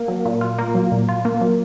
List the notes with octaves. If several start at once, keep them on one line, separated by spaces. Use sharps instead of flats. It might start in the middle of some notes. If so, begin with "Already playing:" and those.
Already playing: A#3
F#3
A#2
F4
A#3
F#3
A#2
F4
A#3
F#3